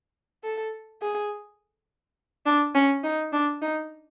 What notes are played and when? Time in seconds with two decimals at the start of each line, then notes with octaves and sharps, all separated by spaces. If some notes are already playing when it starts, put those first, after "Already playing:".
0.44 A4
1.02 G#4
2.46 D4
2.75 C#4
3.04 D#4
3.33 D4
3.62 D#4